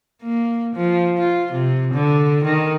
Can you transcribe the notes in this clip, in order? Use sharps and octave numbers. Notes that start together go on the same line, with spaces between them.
A#3
F3
F4
C3
D3
D#3